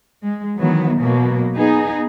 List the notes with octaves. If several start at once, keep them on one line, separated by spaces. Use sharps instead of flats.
G#3
D#3 E3 F#3 B3
B2 F#3 A#3
B3 D#4 G#4